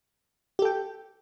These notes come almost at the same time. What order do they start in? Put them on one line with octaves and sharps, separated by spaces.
G4 A4 G5